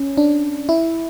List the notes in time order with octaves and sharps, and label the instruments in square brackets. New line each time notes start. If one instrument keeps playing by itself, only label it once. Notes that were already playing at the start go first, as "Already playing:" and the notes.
Already playing: [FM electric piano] C#4
D4
E4